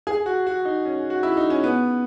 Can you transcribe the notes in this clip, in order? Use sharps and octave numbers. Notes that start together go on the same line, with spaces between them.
G#4
F#4
F#4
D#4
C#4
F#4
E4
D#4
C#4
B3